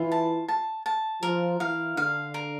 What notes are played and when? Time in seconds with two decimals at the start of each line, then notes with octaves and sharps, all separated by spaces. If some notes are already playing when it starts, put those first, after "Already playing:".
Already playing: E3 E4 F4
0.12 A5
0.48 A5
0.86 A5
1.22 F3 F4 A#4
1.59 E3 E4 F5
1.97 D3 D4 F5
2.34 A#4